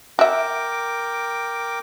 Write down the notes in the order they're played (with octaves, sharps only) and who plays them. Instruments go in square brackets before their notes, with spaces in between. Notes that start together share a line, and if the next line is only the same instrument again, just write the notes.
[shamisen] F#4 E5 [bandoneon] A#4 G5 D6